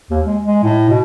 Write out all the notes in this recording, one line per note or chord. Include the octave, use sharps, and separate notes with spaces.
D#2
G#3
G#3
A2
B2